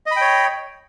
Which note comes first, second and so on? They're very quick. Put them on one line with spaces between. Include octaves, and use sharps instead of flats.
D#5 B5 G5 C#5